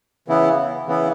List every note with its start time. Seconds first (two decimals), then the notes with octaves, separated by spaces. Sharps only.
0.28 C#3 E3 B3 E4
0.87 C#3 E3 B3 E4